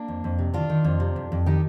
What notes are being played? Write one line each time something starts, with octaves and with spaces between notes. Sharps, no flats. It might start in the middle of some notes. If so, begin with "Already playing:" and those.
Already playing: A#3 D4
F2
F2
C3
D#3 D4 F4
D#3
F2
C3
F2
F2
D#3 D#4 G4